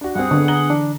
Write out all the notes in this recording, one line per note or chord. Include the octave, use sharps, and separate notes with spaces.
D4 F#4
G2 C4 G#4 F#5
D3 B3 D4 B4
A#5 F#7 G7
E3 D4